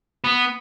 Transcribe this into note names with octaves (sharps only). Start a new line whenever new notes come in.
B3